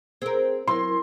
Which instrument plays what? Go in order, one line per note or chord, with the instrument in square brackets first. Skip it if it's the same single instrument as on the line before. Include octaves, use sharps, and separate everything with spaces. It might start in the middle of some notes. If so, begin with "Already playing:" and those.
[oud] C4 A#4 [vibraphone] G#4
[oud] F#3 [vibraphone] E4 A#4 [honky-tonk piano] C6